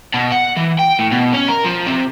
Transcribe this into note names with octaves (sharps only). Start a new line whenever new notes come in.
B2
F#5
E3
G5
A2
B2
C#4
A#4
F3
C3